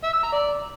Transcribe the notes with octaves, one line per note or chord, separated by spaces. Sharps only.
E5
E6
A#5
D5